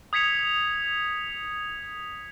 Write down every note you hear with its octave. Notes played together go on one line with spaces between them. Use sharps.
D#6 G#6 B6 C#7 F7